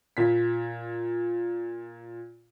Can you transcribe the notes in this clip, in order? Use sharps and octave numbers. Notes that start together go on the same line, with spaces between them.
A#2 B6